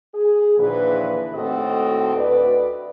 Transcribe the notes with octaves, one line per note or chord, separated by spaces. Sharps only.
G#4
D#2 A#2 D3 E3 F3 B4
D#2 A2 C4 F#4 A4 D#5
D2 B4 D5